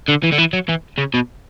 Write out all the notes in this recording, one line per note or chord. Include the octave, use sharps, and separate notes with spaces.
D3
E3
D3
E3
F#3
E3
C#3
B2